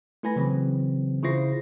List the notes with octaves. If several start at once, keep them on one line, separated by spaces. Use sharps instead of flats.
A3 E4 B4 G#5 B5 A#6
C#3 E3 F#3 C4
C#3 E4 F4 C5 A#6 C7